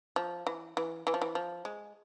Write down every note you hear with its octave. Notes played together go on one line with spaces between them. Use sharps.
F3
E3
E3
E3
F3
E3
F3
G#3